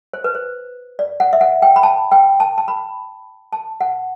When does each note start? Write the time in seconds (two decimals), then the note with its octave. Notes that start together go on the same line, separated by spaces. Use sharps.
0.13 C5
0.24 B4
0.35 C5
0.99 D5
1.20 F#5
1.33 E5
1.41 F#5
1.62 G5
1.76 B5
1.83 A5
2.12 G5
2.40 A5
2.58 A5
2.68 B5
3.53 A5
3.81 F#5